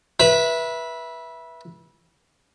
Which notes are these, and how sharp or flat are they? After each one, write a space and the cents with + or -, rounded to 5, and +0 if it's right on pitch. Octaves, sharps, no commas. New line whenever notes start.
B4 -25 E5 +0